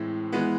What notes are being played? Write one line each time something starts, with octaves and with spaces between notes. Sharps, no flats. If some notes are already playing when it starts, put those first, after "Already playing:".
Already playing: A2 E3 G#3 C4
E3 G#3 B3